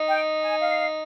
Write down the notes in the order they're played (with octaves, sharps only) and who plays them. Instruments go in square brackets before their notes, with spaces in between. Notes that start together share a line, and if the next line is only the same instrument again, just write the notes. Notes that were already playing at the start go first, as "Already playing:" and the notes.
Already playing: [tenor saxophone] D#4
[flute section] G5
G#5
F5